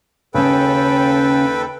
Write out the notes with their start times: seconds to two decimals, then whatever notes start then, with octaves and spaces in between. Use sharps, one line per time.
0.34 D#2 C#3 C#4 A4 B4 G5